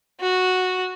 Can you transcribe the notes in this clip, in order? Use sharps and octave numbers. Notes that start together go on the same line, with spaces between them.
F#4